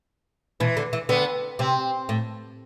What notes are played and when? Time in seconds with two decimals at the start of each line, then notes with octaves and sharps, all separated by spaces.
0.60 B2 E3
0.77 D3
0.93 E3
1.09 D3 B3
1.59 C3 C4
2.09 A2